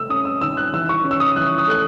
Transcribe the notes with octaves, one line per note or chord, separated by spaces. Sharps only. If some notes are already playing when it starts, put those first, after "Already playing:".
Already playing: C3 A3 E6
C#4 D#6
E6
D#3 E6
F#6
E3 E6
C#6
C#4
E6
D#6
E3 F#6
D#6
A3 F#6